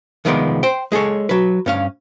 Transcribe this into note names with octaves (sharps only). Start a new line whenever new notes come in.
C2 D#3 F3 G#3 B3 D5
C5 G5
G#3 G#4 A4 C#5
F#3 B4
G2 C#4 F5